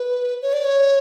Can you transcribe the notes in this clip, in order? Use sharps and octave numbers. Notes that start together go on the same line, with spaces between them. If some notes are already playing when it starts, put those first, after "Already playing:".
Already playing: B4
C#5
D5
C#5